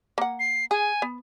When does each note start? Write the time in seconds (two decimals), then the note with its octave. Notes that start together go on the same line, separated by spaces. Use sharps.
0.18 A#3 F#5
0.39 C7
0.71 G#4 G#5
1.02 B3